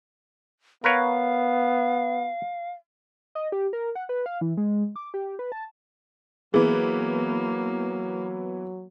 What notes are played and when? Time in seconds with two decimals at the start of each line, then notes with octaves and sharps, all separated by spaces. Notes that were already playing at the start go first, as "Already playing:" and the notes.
0.84 B3 A#4 B4 C#5 F5
3.35 D#5
3.52 G4
3.73 A#4
3.95 F#5
4.09 B4
4.26 F5
4.41 E3
4.57 G#3
4.96 D6
5.14 G4
5.39 B4
5.52 A5
6.54 E3 F#3 A#3 B3 G#4